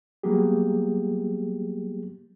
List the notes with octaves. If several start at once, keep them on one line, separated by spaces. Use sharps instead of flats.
F#3 G3 A#3 B3 G4 G#4